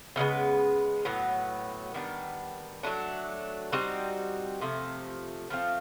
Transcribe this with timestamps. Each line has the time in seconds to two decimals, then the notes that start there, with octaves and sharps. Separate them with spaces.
0.16 C#3 E3 G#3 B3
1.05 A2 F#3 B3
1.94 D#3 G3 B3 D4
2.83 F#3 A3 D4
3.72 G3 C4 D#4 F#4
4.61 C3 F3 A3
5.50 F3 A3 C4 F4